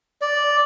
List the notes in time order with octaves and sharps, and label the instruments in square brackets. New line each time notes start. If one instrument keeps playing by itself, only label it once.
[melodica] D5